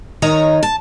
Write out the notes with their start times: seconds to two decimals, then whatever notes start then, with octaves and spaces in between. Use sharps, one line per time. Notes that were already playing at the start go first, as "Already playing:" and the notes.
0.22 D#3 C#5 D#5 A#5
0.63 A5